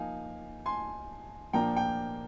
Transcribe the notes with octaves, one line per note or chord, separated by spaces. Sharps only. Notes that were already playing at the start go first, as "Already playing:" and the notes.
Already playing: F3 A#3 D#4 F5 G#5
G#5 C6
A#2 F3 A#3 D4 G5 A#5
G5